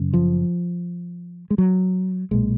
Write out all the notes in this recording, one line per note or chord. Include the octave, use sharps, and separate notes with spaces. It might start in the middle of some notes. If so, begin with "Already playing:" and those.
Already playing: F#1 F#2 C#3
F3
G#3
F#3
B1 A#2 G#3